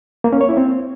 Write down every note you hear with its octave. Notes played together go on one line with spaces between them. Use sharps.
A#3
C#4
C#5
E4
C4